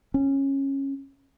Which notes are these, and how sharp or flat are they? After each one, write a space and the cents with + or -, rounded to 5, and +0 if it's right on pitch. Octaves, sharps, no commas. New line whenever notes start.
C#4 -15